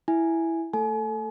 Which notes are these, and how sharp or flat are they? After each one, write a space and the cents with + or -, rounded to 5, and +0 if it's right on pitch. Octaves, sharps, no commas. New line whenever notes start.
E4 +0 G#5 +0
A3 +25 A4 +0 G#5 +40